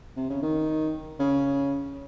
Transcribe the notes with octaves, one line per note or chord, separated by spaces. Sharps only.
C3
C#3
D#3
C#3